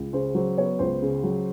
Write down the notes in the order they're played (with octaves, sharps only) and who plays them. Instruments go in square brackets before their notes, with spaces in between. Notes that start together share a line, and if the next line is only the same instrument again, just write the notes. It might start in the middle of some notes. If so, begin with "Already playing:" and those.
Already playing: [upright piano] C#2
C#3 C5
F#3 C5
B3 C#5
C#2 C5
C#3
F#3